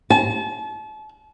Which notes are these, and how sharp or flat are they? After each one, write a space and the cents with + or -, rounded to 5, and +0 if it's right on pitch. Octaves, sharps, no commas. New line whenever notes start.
A5 -35